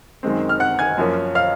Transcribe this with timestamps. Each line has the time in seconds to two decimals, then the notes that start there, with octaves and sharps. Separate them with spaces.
0.23 F#2 D#3 G#3 C4
0.49 F6
0.60 F#5 F#6
0.79 G#5 G#6
0.98 F#2 F3 A#3 C#4
1.35 F5 F6